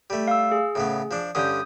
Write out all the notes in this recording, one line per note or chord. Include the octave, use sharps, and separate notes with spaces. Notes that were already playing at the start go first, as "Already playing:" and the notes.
G3 A3
F5 E6
G#4
A2 C#3 B3
F3 D4
G2 D3 C#4 D#6 G6